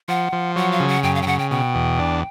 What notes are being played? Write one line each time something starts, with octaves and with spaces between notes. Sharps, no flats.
F3 F#5
F3
F#3 F#5
F5
C#3
F#5
F#2 G5
F5
G5
C#3 F#5
G5
B2 G5
E2
D4